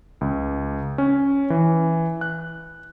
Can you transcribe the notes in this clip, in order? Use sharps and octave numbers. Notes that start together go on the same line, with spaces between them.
C#2
C#4
E3
F#6